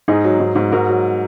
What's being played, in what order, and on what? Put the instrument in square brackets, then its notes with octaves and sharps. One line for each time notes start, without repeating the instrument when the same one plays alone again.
[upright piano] G#2 D#4 G#4
F#3
G#2
G#2
G#2 F#4 A#4
F#3